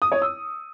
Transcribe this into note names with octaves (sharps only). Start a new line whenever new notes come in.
D#6
C#5
E6